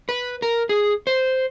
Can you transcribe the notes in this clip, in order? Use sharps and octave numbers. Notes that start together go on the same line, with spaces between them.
B4
A#4
G#4
C5